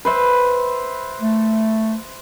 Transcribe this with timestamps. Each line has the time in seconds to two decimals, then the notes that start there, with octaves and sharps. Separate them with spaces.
0.05 B4 C5 E5
1.21 A3